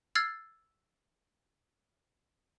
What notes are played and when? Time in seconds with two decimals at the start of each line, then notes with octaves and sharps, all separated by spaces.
0.15 E6 F6 G#6 A6 C7